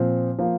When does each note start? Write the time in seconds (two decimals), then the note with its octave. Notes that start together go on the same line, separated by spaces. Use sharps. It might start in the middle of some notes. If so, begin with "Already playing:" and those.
Already playing: A#2 F3 C4
0.39 F3 A#3